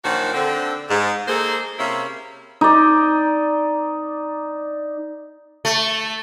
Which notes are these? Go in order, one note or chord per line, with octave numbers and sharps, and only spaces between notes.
A#2 D#3 F3 F#3 D4 F#4
D3 C4
G#2
A#3 D#4 G#4 A4 C5
C3 A#3 C#4 E4
D#4 D5
A3